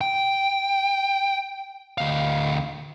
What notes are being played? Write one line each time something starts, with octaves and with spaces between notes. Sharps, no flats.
G5
D2 F5